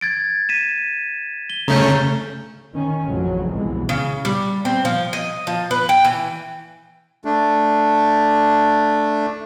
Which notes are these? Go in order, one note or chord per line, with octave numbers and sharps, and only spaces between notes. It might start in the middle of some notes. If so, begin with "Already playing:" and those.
G#6 A6 D7
B6 D#7 E7
G7
C#3 A3 C#4 A#5 G6
D#3 C#4
A1 F2 A2 C#3 F3 F#3
C2 B2 E3 G#3
C#3
G3
C4
F3
D#5
F3
B4
G5
E3
A3 D4